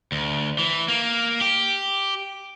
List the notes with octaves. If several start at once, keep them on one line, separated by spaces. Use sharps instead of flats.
D2
E3
A#3
G4